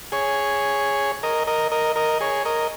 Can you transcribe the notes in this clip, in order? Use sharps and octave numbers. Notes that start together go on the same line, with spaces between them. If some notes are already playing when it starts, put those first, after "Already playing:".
G#4 C#5
A#4 D#5
A#4 D#5
A#4 D#5
A#4 D#5
G#4 C#5
A#4 D#5